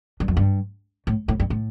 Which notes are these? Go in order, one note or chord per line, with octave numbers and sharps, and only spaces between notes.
G2
F2
G2
A2
A2
G2
A2